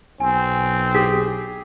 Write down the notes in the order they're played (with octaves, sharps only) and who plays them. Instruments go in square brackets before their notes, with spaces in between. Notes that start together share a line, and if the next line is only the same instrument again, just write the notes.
[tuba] B1 [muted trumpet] C4 [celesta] G#5
[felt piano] G4 G#4 [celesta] B6